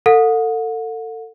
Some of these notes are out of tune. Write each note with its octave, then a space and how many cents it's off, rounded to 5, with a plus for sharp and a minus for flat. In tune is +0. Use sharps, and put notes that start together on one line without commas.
A4 +30 F#5 -40